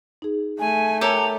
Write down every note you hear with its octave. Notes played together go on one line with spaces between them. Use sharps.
D#4 G#4
A3 G#5
G4 A4 A#4 C#5 G#5 A#5